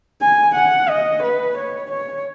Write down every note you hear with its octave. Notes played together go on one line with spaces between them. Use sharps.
G#5
F#5
D#5
B4
C#5
C#5